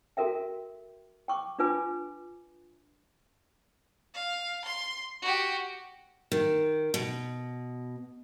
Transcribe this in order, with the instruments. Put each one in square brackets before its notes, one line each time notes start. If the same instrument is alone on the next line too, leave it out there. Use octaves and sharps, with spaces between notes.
[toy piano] F#4 A4 A#4 E5 G5
G5 C#6 D6
D4 F4 B4 G#5 D6
[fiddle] F5
C6
F#4 G4
[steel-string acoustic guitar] D#3
B2